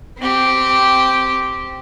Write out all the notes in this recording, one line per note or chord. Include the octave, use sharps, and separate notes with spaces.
C4 G4